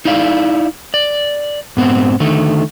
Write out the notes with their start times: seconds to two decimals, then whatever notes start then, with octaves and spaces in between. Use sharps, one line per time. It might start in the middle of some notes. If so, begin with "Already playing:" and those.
0.05 D#4 E4 D5 F5
0.94 D5
1.77 G#2 B3 C4
2.20 D3 D#3 A3